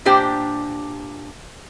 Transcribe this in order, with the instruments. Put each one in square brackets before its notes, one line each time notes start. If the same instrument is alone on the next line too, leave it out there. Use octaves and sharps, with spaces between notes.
[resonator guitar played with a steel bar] A#2 D4 G4 C5 G5